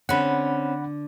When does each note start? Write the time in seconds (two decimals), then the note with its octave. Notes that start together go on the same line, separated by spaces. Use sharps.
0.09 D3 C4 C#4 F#5 B5